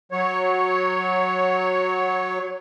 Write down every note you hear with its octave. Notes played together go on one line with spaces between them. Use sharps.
F#3 C#5